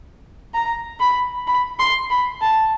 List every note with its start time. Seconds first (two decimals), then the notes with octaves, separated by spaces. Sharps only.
0.54 A#5
1.00 B5
1.47 B5
1.79 C6
2.10 B5
2.41 A5